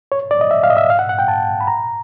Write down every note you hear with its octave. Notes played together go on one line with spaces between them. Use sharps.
C#5
D5
D#5
E5
F5
D#5
E5
F5
F#5
F#5
G5
A5
B5
A#5